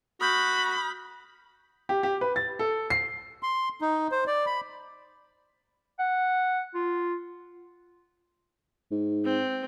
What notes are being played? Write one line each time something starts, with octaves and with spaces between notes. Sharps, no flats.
F#4 B5 D#6 F6 G6
G4
G4
B4
A6
A4
C7
C6
D#4
C5
D5
B5
F#5
F4
G#2
C4